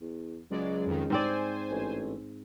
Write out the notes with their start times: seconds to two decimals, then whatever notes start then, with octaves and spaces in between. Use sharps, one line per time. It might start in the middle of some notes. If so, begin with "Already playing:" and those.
0.01 E2
0.51 C#2 F#3 G#3 D5
0.86 F2 D#3
1.10 G#2 C4 C5 D5 G#5
1.71 A1